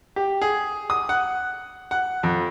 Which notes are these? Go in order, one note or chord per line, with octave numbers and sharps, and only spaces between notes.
G4
G#4
D#6
F#5
F#5
F2